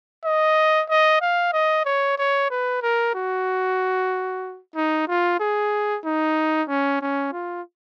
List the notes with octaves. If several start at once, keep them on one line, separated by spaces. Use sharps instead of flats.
D#5
D#5
F5
D#5
C#5
C#5
B4
A#4
F#4
D#4
F4
G#4
D#4
C#4
C#4
F4